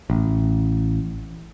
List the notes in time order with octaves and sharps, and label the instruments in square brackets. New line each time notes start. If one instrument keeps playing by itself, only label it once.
[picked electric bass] A1